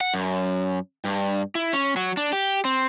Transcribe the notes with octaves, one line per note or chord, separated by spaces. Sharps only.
F#5
F#2
G2
E4
C#4
F#3
D4
G4
C4